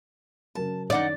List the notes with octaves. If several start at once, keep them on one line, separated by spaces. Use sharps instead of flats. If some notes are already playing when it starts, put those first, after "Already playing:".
C#3 F#3 A#4 A5
F#2 D#3 D4 D#4 D5 F#5 D6